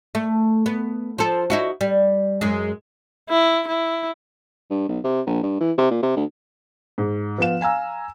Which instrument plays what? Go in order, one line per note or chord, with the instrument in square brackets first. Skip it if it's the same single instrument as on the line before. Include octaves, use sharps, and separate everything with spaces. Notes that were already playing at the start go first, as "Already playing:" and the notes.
[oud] A3
B3
F3 A4
D#4 E4 F#4
G3
F#2 G#3
[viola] E4
E4
[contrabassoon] G2
B1
C3
A#1
G2
E3
C3
A#2
C3
D2
[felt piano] G#2
F3 B3 F5 E7
F5 G#5 A#5 E6